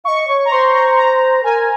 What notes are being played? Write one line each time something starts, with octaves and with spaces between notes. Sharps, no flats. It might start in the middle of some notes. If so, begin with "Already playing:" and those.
D#5 F5 C#6
C#5
A#5
C5 C6
A#5
A#5
A#4 G#5